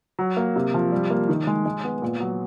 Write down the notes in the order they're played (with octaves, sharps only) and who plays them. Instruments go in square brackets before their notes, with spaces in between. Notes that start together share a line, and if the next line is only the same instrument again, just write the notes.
[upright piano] F#3
A#3
C3
F3
G3
A#3
D#3
G#3
G#3
B3
A#2
F#3